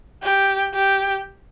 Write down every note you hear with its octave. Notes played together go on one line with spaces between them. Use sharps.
G4
G4